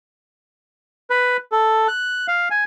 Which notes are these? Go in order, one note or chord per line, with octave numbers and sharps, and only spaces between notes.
B4
A4
F#6
F5
G#5